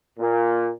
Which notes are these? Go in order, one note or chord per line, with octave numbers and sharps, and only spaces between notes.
A#2